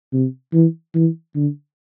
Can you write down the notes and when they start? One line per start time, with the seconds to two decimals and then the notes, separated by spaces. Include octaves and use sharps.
0.13 C3
0.53 E3
0.95 E3
1.35 D3